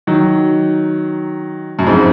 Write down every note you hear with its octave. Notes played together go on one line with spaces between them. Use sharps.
D#3 F#3
F#2
F2 G#2